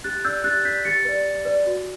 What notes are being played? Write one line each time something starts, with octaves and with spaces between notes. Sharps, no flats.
G4 F#6 A6
D5 E6 G6
G4 F#6 A6
D5 G6 B6
G4 A6 C#7
B4 D5
G4
B4 D5
F#4